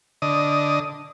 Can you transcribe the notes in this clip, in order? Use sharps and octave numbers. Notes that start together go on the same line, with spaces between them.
D3 D#5